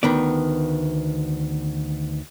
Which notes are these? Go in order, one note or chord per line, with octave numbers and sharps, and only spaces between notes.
D2 D#3 B3 D5